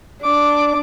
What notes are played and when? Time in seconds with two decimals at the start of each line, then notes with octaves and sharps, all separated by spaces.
0.24 D4 D6